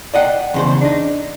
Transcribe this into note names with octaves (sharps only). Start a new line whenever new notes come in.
D5 D#5 F#5 G5
E2 C#3 C5
D4 D#4